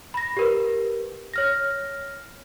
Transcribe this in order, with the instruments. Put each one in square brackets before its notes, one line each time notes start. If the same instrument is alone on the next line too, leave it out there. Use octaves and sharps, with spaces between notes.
[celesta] B5 A#6
G4 A#4 B4
C#5 F6 A#6